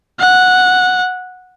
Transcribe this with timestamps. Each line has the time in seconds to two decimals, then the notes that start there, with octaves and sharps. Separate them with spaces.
0.20 F#5